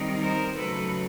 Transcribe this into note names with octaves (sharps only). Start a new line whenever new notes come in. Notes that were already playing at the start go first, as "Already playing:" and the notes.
Already playing: D#3 G3 C4 D#4
A#4 C5
C#3 F#3 A3 A4 B4